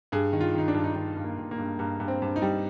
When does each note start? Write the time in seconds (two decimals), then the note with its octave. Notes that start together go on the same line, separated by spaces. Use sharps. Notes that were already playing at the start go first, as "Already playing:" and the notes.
0.12 G2 G#4
0.33 D#3
0.41 F4
0.54 D#3 D#4
0.68 D4
0.74 G2
0.84 D#4
0.95 D#3 D4
1.16 G2
1.24 A#3
1.38 G2
1.51 A#3
1.58 G2
1.79 G2 A#3
2.00 G2
2.08 C4
2.22 G2
2.36 D#4
2.42 G3